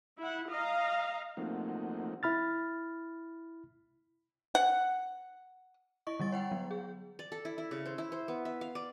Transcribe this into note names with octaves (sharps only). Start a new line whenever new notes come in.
E4 F#5
D#5 F5 A#5
F3 A3 A#3 C4 D#4 F#4
E4 B5 F6 A6
F#5
E4 D#5 C#6
D3 G3 A6
C#5 F#5 G5
F#3 B3
G#4
D5
A4
E4
E4
C#3
C5
E4
C5
B3
E5
F5
D5